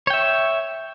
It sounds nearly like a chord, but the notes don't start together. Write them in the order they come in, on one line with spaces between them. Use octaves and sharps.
C#5 G5 E5